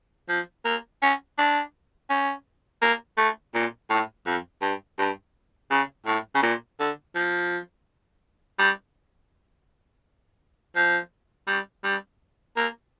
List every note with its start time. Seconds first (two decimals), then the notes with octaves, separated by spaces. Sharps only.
0.29 F3
0.65 A#3
1.02 C#4
1.38 D4
2.10 C#4
2.82 A#3
3.18 A3
3.55 A#2
3.90 A2
4.26 F2
4.62 G2
4.99 G2
5.71 C#3
6.06 A2
6.35 C#3
6.43 A#2
6.80 D3
7.15 F3
8.59 G3
10.76 F3
11.48 G3
11.84 G3
12.57 A#3